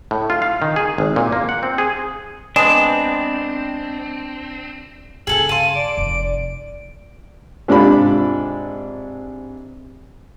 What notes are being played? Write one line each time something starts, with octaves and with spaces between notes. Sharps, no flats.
A2
F4
F5
D#3
G#4
G#1
A#2
A#3
F#5
C4
G#4
G#3 B3 C4 D4 E7
G2 C#3 G#4 A4 G#5 F#7
F5 A5 C6 D#7
D5 D7
F1 F2
G#2 C3 D4 F4 D5 B5